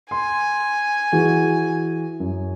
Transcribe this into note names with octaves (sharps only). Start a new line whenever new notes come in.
G#5 C6
E3 F#4 G#4
F#2